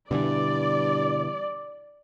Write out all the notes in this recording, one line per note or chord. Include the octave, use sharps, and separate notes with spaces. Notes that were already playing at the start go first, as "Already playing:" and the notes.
G2 B2 D3 E3 D5